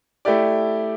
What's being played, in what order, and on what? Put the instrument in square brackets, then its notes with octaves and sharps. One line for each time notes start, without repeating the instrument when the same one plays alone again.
[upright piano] A3 E4 G4 D5